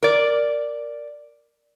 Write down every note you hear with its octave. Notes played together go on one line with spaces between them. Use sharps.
A#4 D5